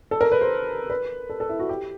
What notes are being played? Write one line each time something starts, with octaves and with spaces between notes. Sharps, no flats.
A4
A#4
B4
C5
B4
A4
A4
E4
F#4
G4